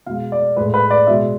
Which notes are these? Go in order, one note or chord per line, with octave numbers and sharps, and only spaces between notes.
B2 G#3 F5
D5
A2 G#3 B4
B4
D5
B2 G#3 E5